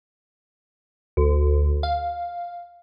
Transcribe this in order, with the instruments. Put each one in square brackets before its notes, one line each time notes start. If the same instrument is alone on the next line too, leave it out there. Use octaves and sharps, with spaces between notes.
[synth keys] D2
F5